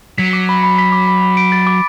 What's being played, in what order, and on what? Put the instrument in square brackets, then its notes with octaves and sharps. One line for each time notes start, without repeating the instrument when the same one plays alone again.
[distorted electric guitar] F#3 [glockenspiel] B6
[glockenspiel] D6
B5
B5
B6
D6
B5
B5
D7
A6
D6